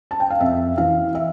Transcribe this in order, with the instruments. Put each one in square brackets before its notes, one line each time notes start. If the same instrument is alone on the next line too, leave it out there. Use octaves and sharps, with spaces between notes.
[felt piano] A5
G5
F5
F2 E5
E3 F5
E5